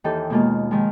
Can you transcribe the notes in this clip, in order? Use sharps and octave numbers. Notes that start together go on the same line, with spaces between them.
D#2 E3 D#4 G4 A4
B2 G#3 A#3 F4
D#3 F3 G#3